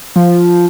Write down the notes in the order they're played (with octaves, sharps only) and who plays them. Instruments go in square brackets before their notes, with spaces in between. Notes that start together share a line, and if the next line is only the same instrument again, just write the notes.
[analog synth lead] F3